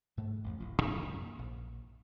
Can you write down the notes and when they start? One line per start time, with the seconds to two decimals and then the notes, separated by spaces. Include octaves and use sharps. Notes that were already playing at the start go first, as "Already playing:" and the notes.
0.17 G#2 A3
0.44 A1 F2
0.58 D1 A1 F3
0.82 F#2 F3 A#3 C#4
1.39 A#1